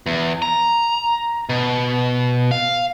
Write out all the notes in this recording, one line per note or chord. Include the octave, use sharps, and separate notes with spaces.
E2
A#5
B2
F5